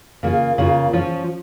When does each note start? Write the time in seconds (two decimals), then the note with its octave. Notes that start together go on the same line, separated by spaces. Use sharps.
0.23 C#3 A#3 F4
0.58 C#3 A#3 F4
0.93 F3 C#4 F4